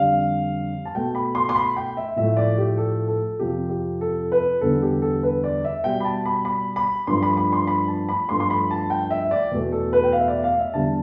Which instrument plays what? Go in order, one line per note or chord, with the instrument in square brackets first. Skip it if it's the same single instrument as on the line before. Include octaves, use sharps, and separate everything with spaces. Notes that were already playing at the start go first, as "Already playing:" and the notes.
Already playing: [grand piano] F2 D3 G3 F5
A5
B2 A3 G5
B5
C6
C6
B5
G5
E5
A2 F3 A3 E5
D5
G4
A4
A4
F2 C3 F3 G4
G4
A4
B4
E2 D3 G3 A4
G4
A4
B4
D5
E5
B2 G3 G5
B5
A5
B5
B5
B5
G2 F3 A3 C6
B5
B5
C6
B5
A5
B5
G2 F3 A3 C6
C6
B5
A5
G5
E5
D5
E2 B2 A3
A4
B4
G5
F5
E5
D5
F5
E5
E2 D3 G3 A5